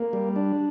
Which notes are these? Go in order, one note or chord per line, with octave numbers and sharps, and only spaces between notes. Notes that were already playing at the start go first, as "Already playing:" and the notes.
Already playing: A#3
G3
D4